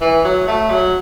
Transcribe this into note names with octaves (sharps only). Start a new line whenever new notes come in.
E3
F#3
A3
F#3